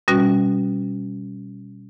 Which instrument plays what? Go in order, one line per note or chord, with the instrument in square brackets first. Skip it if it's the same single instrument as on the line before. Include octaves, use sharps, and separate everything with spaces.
[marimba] B2 G3 C#4 F#4